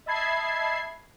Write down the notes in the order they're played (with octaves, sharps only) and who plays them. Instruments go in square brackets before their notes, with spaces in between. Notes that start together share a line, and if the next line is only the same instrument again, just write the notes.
[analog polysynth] D#5 E5 A5 B5 G#6 C7